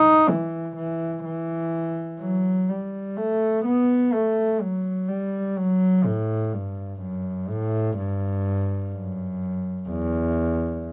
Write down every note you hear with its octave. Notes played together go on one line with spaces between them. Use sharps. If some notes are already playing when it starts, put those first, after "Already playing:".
Already playing: D#4
E3
E3
E3
F#3
G3
A3
B3
A3
F#3
G3
F#3
A2
G2
F#2
A2
G2
F#2
E2